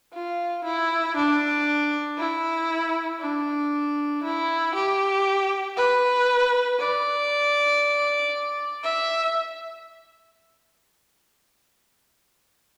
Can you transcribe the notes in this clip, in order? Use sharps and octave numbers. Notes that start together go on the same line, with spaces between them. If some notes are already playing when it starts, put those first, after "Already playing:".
F4
E4
D4
E4
D4
E4
G4
B4
D5
E5